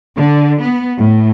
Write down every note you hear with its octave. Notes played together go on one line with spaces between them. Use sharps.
D3
B3
A2